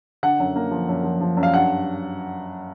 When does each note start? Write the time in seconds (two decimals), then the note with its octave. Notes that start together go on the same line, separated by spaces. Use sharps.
0.23 D3 F#5
0.40 F#2
0.56 A#3
0.71 F3
0.88 F#2
1.04 F3
1.21 F3
1.37 F#2
1.43 F5
1.54 G2 F#5